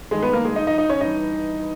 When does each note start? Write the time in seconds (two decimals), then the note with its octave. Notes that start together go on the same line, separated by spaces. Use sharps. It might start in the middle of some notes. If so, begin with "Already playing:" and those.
0.11 G2 D#3 G#3 G#4
0.23 B3 B4
0.33 A#3 A#4
0.45 G#3 G#4
0.56 D#4 D#5
0.67 D#4 D#5
0.78 D#4 D#5
0.90 C#4 C#5
1.01 G2 E3 D#4 D#5